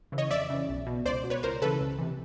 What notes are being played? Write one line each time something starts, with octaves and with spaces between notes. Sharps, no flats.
C#3 E3
C#5 D#5
F2 D5 E5
C#3 E3
B1
B2
C#2 C5 D5
B2
B4 C#5
C#2 A#4 C5
C#3 E3 A4 B4
C#2
C3 E3